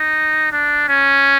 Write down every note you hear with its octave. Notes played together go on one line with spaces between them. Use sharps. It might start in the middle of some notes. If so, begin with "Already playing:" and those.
Already playing: D#4
D4
C#4